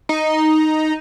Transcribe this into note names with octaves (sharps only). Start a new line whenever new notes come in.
D#4